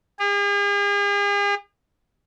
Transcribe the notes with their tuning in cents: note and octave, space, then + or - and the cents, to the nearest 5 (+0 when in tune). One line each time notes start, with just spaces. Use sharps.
G#4 -45